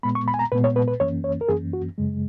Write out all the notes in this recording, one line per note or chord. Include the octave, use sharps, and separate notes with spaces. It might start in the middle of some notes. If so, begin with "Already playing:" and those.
A#2 G#3 B3 B5
C#6
B5
G#5
A#5
A#2 G#3 B3 B4
C#5
B4
B4
F#2 E3 A#3 C#4 C#5
C#5
A#4
F#2 E3 A#3 C#4 G#4
F#4
F#2 C#3 G#3